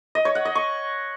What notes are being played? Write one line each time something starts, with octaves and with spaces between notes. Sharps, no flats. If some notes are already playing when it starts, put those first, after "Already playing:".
D#5
C#5
F#5
D#5
C#6